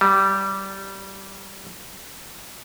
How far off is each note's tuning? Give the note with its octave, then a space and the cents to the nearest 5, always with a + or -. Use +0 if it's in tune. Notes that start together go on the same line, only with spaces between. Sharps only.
G3 -15